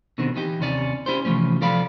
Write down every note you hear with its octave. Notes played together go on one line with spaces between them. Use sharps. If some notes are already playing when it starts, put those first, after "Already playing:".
B2 D3 D#3 C4
E3 D#4 G4
D#2 C3 C#4 D5
C#4 E4 G4 C5
C3 E3 F3 A3 C#4
C2 F3 A4 D5 F5 B5